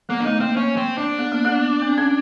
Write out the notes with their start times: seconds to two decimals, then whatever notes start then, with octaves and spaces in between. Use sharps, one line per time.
0.09 A#3 B3
0.20 D4
0.25 A3 D#4
0.40 A#3 C4
0.57 A#3 C#4
0.77 C4
0.98 D4
1.19 B3
1.32 A#3
1.45 B3
1.82 C4
1.98 C#4